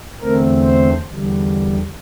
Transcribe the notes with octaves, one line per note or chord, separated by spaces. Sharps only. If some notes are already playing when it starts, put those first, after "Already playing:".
E2 D3 A3 C4 A#4
C5
E2 D3 G3